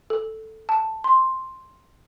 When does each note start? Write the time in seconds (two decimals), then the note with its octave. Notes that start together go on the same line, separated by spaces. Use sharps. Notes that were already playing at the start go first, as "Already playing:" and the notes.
0.10 A4
0.69 A5
1.04 C6